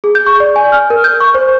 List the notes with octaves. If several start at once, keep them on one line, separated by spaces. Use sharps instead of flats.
G#4
G6
C#6
D5
G#5
F6
A#4
G6
C#6
C5